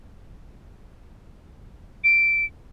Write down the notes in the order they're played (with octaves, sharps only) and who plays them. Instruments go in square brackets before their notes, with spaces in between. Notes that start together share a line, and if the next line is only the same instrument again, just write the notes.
[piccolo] D7